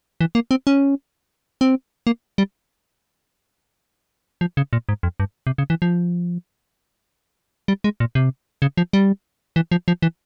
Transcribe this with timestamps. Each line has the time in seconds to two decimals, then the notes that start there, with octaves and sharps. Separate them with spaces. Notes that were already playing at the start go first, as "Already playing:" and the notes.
0.21 E3
0.35 A#3
0.51 C4
0.67 C#4
1.61 C4
2.07 A#3
2.38 G3
4.41 F3
4.57 C#3
4.73 A#2
4.89 G#2
5.03 F2
5.20 G2
5.47 C3
5.58 C#3
5.70 E3
5.82 F3
7.68 G3
7.84 G#3
8.00 A#2
8.15 C3
8.62 C#3
8.77 F3
8.93 G3
9.56 E3
9.72 F3
9.88 F3
10.02 E3